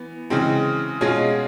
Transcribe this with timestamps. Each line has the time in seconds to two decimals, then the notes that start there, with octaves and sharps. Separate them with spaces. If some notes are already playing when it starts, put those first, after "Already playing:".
Already playing: E3 B3
0.30 C#3 E3 G#3 C4
1.01 B2 G#3 C#4 F4 G#4